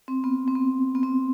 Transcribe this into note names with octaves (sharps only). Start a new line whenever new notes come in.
C4
B3
C4
B3
B3
C4